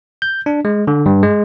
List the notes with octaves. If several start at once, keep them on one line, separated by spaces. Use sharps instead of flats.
G6
D4
G#3
D3
G2
G#3